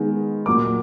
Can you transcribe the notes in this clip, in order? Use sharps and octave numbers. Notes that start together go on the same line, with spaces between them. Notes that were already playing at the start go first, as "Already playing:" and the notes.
Already playing: D#3 G#3 B3
A#2 F#3 A#3 D6